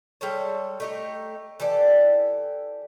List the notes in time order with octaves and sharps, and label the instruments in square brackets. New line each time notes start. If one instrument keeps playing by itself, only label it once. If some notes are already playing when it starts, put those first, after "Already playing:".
[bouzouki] G3 G#3 A4 C#5
A3 D#4 G4
E3 G4 A4 D5